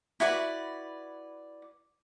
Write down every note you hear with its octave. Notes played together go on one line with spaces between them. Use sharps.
E4 F#4 B4 D5